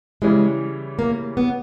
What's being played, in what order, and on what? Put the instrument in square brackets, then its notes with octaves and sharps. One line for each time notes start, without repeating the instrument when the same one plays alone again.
[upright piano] C#3 E3 G3 C#4 E4 [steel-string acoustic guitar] G#3
[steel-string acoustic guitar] A#3
B3